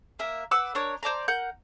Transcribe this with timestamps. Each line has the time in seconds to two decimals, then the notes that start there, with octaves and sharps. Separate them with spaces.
0.19 A#3 A#4 E5
0.51 B4 F#5 D6 E6
0.75 D4 A#4 C#5
1.03 C5 D5 A5 A#5
1.28 A#4 F#5 G6